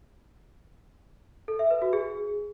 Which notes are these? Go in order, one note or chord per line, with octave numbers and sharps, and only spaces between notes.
A4
E5
B4
F#4
G#4